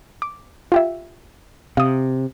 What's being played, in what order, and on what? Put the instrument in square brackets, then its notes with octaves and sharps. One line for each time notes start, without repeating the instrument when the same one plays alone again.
[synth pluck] D6
F4 G4 E5
[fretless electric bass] C3 [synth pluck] F5 D#6